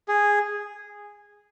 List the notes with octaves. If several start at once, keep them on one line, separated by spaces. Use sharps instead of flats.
G#4